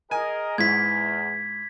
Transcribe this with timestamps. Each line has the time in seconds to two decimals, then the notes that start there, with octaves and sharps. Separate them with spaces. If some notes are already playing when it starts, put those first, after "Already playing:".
0.11 G#4 A#4 D#5 G#5
0.58 E2 G#2 E4 G#6 B6